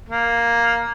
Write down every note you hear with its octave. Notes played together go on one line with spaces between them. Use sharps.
A#3